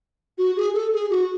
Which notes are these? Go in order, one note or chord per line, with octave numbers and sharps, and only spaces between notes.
F#4
G#4
A4
G#4
F#4